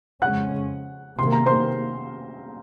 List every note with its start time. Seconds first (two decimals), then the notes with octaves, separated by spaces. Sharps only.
0.22 F2 C#3 G#3 C#4 F#5 F#6
1.19 C3 D#3 A#3 C6
1.32 A#5
1.46 C5 C6